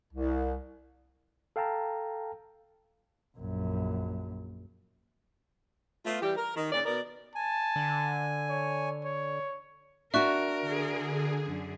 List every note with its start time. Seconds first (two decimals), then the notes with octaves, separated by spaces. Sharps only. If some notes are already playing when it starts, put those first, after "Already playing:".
0.14 C2
1.56 A4 F5 G5 A5 A#5
3.38 A#1 F#2
6.05 A3 B3 F4
6.22 E3 G3 G4
6.36 A#4
6.56 D#3
6.72 A#2 C#3 D5
6.85 B2 B3 A#4 D5
7.35 G#5 A5
7.76 D3
8.50 C#5
9.05 C#5
10.14 D4 F#4 A#4 E5 C#6 F#6
10.61 D3 G#4
11.46 F#2 D3